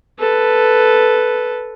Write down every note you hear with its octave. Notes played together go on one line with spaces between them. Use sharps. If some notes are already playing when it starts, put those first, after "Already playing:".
A4 B4